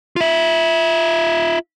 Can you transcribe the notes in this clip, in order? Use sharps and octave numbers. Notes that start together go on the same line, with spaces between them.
F4 E5